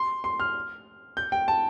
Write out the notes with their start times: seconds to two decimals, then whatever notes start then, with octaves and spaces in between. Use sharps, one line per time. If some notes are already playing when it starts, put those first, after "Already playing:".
Already playing: C6
0.24 C6
0.40 F6
1.17 G6
1.32 G5
1.48 A5